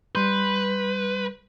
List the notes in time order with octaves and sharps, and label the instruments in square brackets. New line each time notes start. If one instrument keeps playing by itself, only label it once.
[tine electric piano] G3 C6 G6 [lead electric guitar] B4